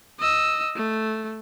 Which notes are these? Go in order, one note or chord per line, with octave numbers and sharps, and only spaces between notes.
D#5 E6
A3